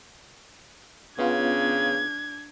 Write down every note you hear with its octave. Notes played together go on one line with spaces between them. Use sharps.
C#3 B3 C#4 D4 F4 G#6